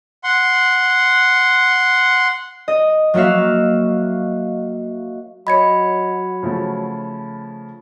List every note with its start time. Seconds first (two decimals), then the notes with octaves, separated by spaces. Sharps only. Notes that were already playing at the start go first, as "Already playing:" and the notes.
0.24 F#5 C6
2.68 D#5
3.14 F#3 A#3 F#4 E5 F5
5.47 F#3 C#5 D#5 B5 G#6 C#7
6.43 C#3 F3 A3